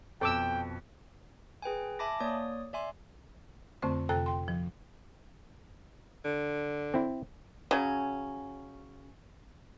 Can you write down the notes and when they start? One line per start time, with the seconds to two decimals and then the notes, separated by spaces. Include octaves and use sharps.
0.21 F2 B2 A4 G5 D6 E6
1.62 G#4 B4 G5 G#5
1.99 E5 G#5 A5 B5 D6 A#6
2.20 A#3 C#5 D5 D#6
2.73 D5 E5 G#5 C6
3.82 F2 D3 A3 C4 C5 C#6
4.09 F2 C3 A4 G5 A#5 F#6
4.26 G5 C6
4.48 F3
6.25 D3
6.94 C4 E4
7.71 C#3 F#3 C#4